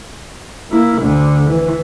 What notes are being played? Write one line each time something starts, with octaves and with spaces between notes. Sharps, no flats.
A#3 E4
D2 D3
E3